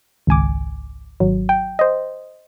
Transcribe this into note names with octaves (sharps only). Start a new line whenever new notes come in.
G#1 C#2 G#5 D6
G#1 F#3
G5
C5 D#5